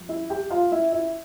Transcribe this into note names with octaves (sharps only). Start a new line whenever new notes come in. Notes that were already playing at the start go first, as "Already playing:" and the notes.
Already playing: F2 G3
E4 E5
G4 G5
F4 F5
E4 E5
E4 E5